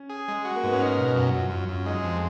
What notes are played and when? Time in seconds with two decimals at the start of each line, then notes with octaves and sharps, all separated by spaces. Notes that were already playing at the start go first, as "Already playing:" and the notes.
Already playing: C#4
0.09 G#4
0.28 G#3
0.45 F#4
0.56 A#3
0.64 G#2 B3
0.72 C#4
0.80 D#4 A#4
0.98 B2
1.15 F#2 F#4
1.28 F#4
1.34 F#2
1.39 F4
1.50 F#2 F4
1.69 F#2
1.86 G#3 D#4
2.03 F2